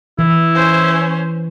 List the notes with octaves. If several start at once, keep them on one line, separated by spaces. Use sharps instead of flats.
E3 E4
C#4 C5